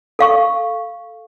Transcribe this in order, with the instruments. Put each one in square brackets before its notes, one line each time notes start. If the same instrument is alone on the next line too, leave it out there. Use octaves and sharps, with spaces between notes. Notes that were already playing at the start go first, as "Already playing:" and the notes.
[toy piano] A4 F5 C#6